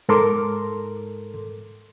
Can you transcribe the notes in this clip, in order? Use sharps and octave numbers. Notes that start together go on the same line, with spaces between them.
G#2 A4 A#4 C6 D6